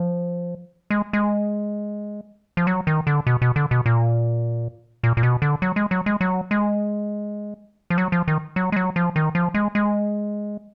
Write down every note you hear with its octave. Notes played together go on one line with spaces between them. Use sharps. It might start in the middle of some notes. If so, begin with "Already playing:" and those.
Already playing: F3
G#3
G#3
F3
F#3
D#3
D3
B2
B2
D3
B2
A#2
A#2
A#2
B2
D3
F#3
G#3
F#3
G#3
F#3
G#3
F3
F#3
F3
D#3
F#3
G#3
F#3
F3
D#3
F3
G#3
G#3